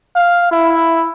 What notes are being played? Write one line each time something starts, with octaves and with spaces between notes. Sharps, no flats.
F5
E4